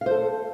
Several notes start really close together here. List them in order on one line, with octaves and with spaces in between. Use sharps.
F5 C5 A4